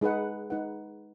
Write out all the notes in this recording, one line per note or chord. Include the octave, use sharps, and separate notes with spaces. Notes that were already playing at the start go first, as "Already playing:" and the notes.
G#3 D#4 G#4 B4 F#5
G#3 D#4 G#4 B4 F#5